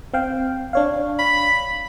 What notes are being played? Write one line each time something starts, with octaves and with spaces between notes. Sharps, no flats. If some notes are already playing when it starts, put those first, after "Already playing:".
C4 F5 G5
D4 C#5 F5
B5